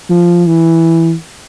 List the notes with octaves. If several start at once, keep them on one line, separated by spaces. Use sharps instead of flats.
F3
E3